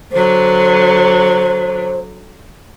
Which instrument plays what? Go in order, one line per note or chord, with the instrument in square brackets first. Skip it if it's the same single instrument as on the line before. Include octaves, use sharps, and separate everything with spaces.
[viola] D3 F#3 [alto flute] C5